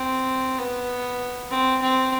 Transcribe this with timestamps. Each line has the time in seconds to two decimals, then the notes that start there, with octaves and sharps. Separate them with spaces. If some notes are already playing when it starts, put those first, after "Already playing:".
Already playing: C4
0.58 B3
1.51 C4
1.82 C4